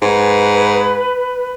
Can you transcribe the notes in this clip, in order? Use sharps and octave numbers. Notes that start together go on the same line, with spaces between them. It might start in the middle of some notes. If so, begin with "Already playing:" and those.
G#2 B4